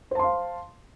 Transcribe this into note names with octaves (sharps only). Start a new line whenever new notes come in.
C5 F5 A5 C6